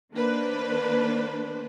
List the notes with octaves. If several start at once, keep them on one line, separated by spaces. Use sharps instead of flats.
D#3 A#3 D4 B4 C5